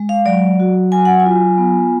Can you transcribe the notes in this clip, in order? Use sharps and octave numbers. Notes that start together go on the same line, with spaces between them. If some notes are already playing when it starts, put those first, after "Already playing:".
Already playing: G#3
F5
F#3 D5
F#4
F#3 G#5
F#5
G#5
F4
B3